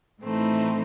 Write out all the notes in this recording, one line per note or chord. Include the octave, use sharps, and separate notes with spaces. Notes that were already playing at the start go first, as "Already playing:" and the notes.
A2 E3 A3 C4 D#4